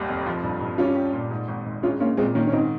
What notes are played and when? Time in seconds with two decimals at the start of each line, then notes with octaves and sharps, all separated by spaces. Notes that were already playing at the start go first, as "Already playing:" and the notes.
Already playing: G#1 D#2 G3
0.08 F1
0.26 F3
0.43 G2
0.61 G2
0.78 G3 C#4 F4
0.96 G4
1.13 A#2
1.31 G#2
1.48 G#1
1.66 G#1
1.83 G#3 C#4 F4
2.00 A#3 C#4 F4
2.17 A#2 G#3 C4
2.35 D#3 A#3 C#4
2.47 C#4
2.52 G#2 C4 D#4